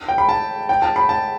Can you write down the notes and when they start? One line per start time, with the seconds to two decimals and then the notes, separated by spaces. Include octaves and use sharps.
0.08 G5
0.18 B5
0.29 A5
0.69 G5
0.82 A5
0.96 B5
1.09 A5